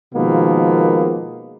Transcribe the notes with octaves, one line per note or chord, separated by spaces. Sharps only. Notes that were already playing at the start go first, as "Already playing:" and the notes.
B2 D#3 F3 G#3 A#3 B3